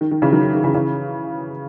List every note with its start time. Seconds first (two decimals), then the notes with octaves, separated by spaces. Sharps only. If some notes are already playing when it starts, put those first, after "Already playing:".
0.01 D#3
0.11 D#3
0.22 C#3 E3
0.32 D#3 F#3
0.43 D#3
0.54 D#3
0.64 C#3 E3
0.74 C#3 E3